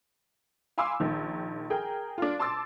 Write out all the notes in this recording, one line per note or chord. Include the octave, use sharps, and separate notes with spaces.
F5 G#5 B5 C6 D6 E6
A#1 D#3
G#4 A#4 G5
D4 F4
A5 C6 D6 E6 A6